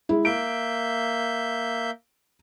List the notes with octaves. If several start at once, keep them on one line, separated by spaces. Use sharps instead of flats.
G#3 E4
A#3 E5 G6 D7